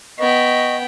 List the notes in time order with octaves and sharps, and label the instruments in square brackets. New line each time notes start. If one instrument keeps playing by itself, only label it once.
[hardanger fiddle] B3 G5 [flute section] D#5 C#6